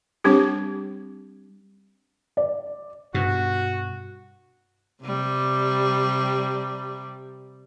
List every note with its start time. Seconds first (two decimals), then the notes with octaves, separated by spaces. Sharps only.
0.24 G3 C4 D4 G4
2.37 D5
3.14 G2 B2 F#4
5.03 C3 G3